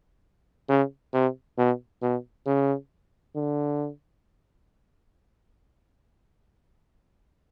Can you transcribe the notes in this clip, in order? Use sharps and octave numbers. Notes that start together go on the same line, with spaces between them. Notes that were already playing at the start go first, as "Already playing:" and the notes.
C#3
C3
B2
B2
C#3
D3